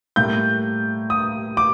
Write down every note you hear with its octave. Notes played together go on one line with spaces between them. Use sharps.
A2 G3 A#3 G6
D#6
D6